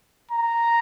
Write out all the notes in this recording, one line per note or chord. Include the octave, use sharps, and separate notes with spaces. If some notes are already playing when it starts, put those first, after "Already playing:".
A#5